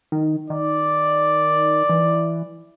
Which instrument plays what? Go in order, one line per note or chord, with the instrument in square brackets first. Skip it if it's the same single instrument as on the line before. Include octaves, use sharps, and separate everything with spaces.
[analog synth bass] D#3
[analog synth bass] D#3 [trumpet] D5
[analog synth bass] E3